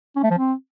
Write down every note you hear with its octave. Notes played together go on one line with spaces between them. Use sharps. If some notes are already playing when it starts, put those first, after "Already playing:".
C#4
A3
F3
C4